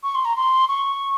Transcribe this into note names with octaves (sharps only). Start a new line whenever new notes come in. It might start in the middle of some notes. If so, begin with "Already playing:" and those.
C#6
C6
A#5
C6
C#6